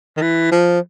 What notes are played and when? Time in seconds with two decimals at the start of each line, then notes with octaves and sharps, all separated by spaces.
0.17 D#3
0.22 E3
0.52 F3